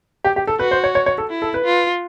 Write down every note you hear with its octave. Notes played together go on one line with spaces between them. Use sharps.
G4
G4
A4
F#4 B4
C5
C#5
C#5
C#5
A4
E4
A4
B4
F4